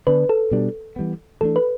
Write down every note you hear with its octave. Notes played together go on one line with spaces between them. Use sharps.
D3 B3 D4 B4
A4
B2 G3 D4
E3 G3 B3
E3 A3 D4 A4
B4